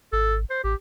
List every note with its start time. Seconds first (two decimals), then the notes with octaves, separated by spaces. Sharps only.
0.13 G#1 A4
0.50 C5
0.64 A1 G4